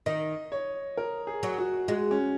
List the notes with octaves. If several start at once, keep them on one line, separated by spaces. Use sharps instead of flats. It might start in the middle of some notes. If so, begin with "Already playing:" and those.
D#3 D#5
C#5
A#4
G#4
F#3
F#4
G#3 F#4
C#4